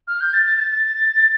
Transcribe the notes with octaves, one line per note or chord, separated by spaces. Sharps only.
F6
G6
A6
A6
A6